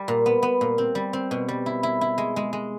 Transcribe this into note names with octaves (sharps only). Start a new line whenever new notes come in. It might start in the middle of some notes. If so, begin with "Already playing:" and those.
Already playing: G3
A#2
B3
B3
A#2
C4
G3
C4
B2
G3
E4
E4
E4
G#3
G#3
G#3